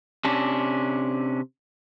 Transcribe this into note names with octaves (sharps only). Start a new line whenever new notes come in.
C3 C#4 D4